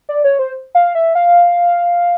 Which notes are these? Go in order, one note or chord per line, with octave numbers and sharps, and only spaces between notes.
D5
C#5
C5
F5
E5
F5